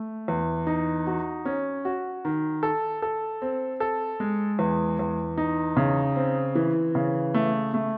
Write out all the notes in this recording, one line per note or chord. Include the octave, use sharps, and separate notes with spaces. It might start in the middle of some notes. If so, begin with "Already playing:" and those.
Already playing: A3
E2
D#4
F#4
C#4
F#4
D#3
A4
A4
C4
A4
G#3
E2
E2
D#4
C#3
C4
E3
C#3
A3
A3